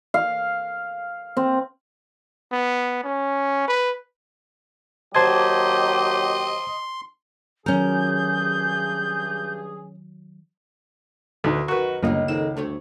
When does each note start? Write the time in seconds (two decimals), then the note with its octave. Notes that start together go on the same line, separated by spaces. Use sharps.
0.14 F5
1.37 C4
2.52 B3
3.04 C#4
3.68 B4
5.15 D#2 F#3 G4 C5 D#5 A5 C6 G#6
7.66 G2 D#3 F#3 C#4 G#4 A#4 G6
11.44 D2 B3 D#4 E4 A4 B4
11.68 F#2 D#3 F#4 A#4 B4 C#6
12.03 G1 C#2 F#2 G#3 A#3 D#4 F4 D#5
12.28 D#3 G#3 C4 A4 E7
12.57 D2 G2 A3 C#5